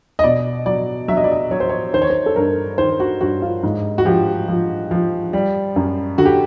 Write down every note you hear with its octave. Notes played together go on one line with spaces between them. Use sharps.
D#5
B2 D5
F#3 D5
F#3 E5
D#5
D5
D#5
F#3 C#5
C5
C#5
D#3 C5
C#5
C5
A4
G2 A#4
D#3 C5
F#4
G2 F#4
F4
G#2
F#4
F3 G4
F3
F3
G3
F#2
D3 F#4
G4